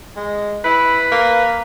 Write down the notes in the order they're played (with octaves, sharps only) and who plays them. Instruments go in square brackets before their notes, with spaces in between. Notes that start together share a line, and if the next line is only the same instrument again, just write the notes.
[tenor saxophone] G#3
[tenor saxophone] E4 [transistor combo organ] B4
[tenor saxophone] A#3